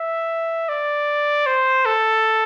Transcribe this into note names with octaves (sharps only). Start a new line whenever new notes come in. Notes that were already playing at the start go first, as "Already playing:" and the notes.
Already playing: E5
D5
C5
A4